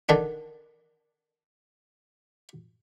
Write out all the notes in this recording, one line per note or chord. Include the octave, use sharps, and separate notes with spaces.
D3 D#3 D4